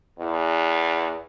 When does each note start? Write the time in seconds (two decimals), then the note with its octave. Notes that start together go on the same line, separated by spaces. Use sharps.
0.19 E2